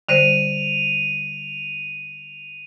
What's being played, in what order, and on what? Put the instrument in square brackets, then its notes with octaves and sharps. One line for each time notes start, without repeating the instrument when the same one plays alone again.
[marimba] D3 G3 C5 [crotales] D#7 F7